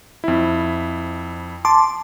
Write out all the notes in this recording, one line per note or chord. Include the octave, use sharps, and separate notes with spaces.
F2 E4
A5 C6 D6